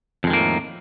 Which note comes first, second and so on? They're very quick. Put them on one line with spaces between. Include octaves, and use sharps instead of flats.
F2 G#3 D#3 A#3 A2